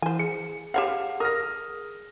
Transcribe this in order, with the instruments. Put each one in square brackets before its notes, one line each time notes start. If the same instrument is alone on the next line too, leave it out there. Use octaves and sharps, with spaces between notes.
[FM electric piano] E3 [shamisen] C5 G#5
[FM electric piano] G#4 [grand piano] C#7
[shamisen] G4 C#5 F#5 [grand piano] F5 E7
[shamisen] A#4 [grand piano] D#6 F6 A#6